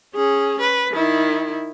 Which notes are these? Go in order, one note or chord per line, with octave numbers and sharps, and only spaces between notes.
C#4 G#4
B4
D#3 E4